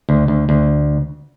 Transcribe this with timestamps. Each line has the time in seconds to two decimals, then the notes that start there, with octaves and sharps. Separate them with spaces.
0.09 D2
0.28 D2
0.49 D2